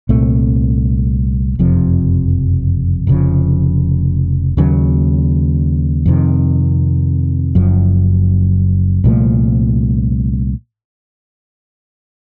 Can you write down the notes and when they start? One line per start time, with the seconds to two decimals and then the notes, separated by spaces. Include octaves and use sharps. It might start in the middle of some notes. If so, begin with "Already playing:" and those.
0.09 C2 A#2 A3 C4
1.59 F#1 F2 C3 F3
3.07 F1 F2 C#3 F3
4.57 D#2 C#3 F#3
6.06 F2 C3 D#3
7.55 F#1 F#2 F3
9.04 C2 A#2 F3 A3